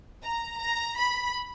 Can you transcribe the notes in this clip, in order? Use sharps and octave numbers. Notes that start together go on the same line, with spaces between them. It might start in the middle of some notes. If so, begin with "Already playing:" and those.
A#5
A#5
B5